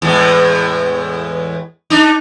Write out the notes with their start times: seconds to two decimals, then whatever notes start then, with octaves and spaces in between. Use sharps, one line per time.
0.02 E2 A2 G#3
1.90 D4 D#4